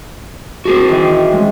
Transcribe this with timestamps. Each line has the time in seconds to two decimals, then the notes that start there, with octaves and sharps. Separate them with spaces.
0.65 C4 F#4 G#4 A4
0.89 D#3 E3
1.32 G#3 C#4